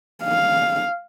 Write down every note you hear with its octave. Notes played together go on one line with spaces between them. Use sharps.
F5